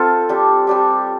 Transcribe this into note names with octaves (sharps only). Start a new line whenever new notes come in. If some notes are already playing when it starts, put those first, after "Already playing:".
Already playing: C4 F4 A4
G3 D4 G4
G3 D4 G4